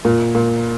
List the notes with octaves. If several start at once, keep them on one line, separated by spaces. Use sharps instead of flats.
A#2
A#2